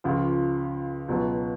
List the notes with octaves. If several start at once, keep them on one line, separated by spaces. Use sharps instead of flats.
C#2 C#3 F3
C#2 B2 F#3 B3